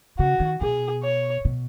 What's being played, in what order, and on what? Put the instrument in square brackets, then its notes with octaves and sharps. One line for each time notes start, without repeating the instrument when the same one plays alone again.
[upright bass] C#3 [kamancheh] F#4
[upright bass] D#3
[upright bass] B2 [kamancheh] G#4
[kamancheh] C#5
[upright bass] B2